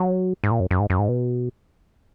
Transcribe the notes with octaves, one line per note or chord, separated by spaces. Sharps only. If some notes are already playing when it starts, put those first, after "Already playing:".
Already playing: F#3
G#2
A#2
F#2
F#2
G#2
F#2
G#2
B2